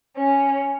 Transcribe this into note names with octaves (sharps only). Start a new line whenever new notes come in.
C#4